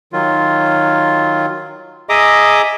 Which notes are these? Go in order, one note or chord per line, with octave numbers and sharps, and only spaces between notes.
D#3 F#3 F4
G#4 D#5 E5 A#5 D6 D#6